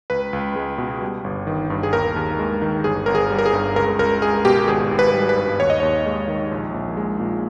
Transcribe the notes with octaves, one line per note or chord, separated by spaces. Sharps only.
C#2 B4
C#2
G#3
B2
G3
G1
D#3
G2
G#4
D#2 A#4
D#2
G#3
D#3
G1 G#4
G1 A#4
G#4
G3
A#4
G#4
G2
C#2 A#4
C#2 A#4
G#3 G#4
B2 G4
G#1 G#4
G#1
B4
G3
B4
G2
D#2 C#5
D#5
D#2 C#5
G#3
D#3
A#1
A#1
G#3
A#2